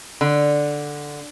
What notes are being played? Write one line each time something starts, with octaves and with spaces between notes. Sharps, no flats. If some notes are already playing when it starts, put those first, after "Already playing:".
D3